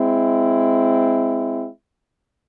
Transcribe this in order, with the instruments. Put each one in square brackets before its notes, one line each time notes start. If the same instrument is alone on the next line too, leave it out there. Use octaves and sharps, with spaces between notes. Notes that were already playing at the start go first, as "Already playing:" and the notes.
Already playing: [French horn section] G#3 C4 E4